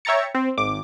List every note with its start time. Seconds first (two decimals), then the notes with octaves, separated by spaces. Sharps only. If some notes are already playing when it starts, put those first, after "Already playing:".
0.05 C#5 E5 G5 A#5 A6 C#7
0.35 C4
0.57 G#1 D6